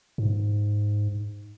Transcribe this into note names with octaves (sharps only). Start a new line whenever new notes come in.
G#2